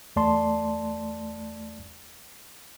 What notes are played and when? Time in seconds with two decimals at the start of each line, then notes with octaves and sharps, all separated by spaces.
0.16 E2 A3 D5 A5 C6